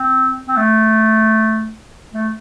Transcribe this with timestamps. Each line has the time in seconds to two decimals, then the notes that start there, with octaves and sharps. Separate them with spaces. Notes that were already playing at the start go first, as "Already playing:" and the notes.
Already playing: C4
0.48 C4
0.57 A3
2.14 A3